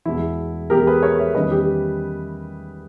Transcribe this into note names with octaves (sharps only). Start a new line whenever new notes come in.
E2 B2 G#3 E4
E2 B2 G#3 G4 A#4
G#4 B4
A#4 C#5
C#5 E5
E2 D#3 G3 C#4 B4 D#5
G4